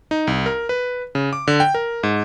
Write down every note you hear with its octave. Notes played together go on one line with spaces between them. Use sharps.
D#4
C2
A#4
B4
C#3
D6
D3
G5
A#4
G#2